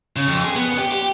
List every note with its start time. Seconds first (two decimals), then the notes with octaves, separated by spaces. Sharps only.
0.16 C#3
0.28 F2
0.44 G#4
0.56 B3
0.78 G4
0.92 G4